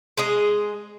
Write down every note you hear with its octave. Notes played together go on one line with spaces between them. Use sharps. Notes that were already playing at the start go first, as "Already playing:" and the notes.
G#3 G#4 D#5